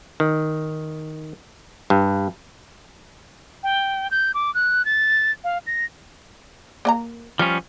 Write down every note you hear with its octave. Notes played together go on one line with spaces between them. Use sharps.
D#3
G2
G5
G6
D6
F#6
A6
F5
A#6
A#3 D#5 A#5
F3 G3 C#4 D5